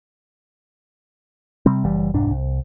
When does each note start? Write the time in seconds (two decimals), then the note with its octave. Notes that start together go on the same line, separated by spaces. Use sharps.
1.66 C3 G3 C4
1.84 F#1 E3 G3
2.14 F1 C2 G#2 D4
2.31 C2